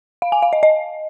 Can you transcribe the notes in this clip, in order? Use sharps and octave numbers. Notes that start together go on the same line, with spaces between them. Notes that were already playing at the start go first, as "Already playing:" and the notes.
F5
G#5
F5
D#5
D#5